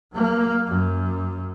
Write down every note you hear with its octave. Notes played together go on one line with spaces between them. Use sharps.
F#3 A#3
F#2